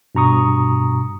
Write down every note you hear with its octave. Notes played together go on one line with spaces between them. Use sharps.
G2 B2 A#5 C#6 D#6